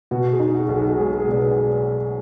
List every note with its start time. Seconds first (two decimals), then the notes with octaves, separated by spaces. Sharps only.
0.11 B2 F#4
0.33 G#4
0.40 D#4
0.55 F#4
0.69 B1
0.76 F#4
0.98 G#3 G#4
1.20 G#4
1.27 B2 D5
1.42 B4